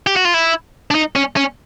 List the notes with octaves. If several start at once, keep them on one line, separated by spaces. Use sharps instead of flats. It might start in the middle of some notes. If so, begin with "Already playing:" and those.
G4
F#4
F4
E4
D4
D#4
C#4
C#4